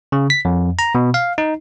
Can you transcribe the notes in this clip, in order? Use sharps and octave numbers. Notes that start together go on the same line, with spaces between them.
C#3
B6
F2
A#5
B2
F5
D#4